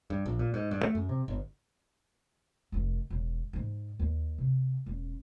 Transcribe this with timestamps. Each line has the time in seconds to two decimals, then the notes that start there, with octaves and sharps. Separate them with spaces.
0.10 G2
0.26 A#1
0.39 A#2
0.54 G#2
0.71 G2
0.83 A3
0.95 F#2
1.09 C3
1.28 G1
2.72 F1 D#3
3.10 E1
3.53 G#2 D#4
3.99 D#2
4.38 C3
4.86 E1 C#4